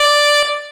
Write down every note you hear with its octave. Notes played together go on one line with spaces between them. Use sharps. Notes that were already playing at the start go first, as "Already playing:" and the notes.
Already playing: D5